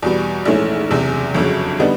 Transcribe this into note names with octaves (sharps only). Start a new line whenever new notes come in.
E2 B2 G3
A#1 G#2 E3 A3 C#4
F#1 E2 C3
G1 F2 C#3 F#3
D3 G3 B3 D#4